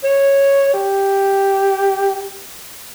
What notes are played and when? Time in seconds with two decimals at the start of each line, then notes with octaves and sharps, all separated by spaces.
0.03 C#5
0.73 G4